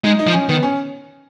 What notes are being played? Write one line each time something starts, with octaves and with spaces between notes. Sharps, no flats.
G#3 D#4
D#4
F3
C#4
D#3 B3
C#4